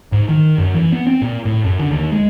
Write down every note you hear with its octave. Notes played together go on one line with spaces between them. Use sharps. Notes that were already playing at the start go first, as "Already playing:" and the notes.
G#2
D#3
F#2
E3
B3
C4
A#2
A2
F#2
D3
D#2
G#3